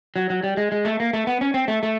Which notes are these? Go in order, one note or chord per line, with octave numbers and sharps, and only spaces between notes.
F#3
F#3
G3
G#3
G#3
A3
A#3
A3
B3
C#4
C4
A3
A3